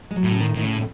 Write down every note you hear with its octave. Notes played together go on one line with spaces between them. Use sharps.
G#3
F#3
A2
C#3
D#3
A2 D#3
C#3